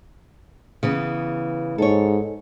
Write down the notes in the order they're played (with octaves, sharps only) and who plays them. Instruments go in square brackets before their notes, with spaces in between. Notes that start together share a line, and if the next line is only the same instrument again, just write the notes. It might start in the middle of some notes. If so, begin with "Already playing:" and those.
[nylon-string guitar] C#3 E3 B3
[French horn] G#2 [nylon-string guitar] A4 C#5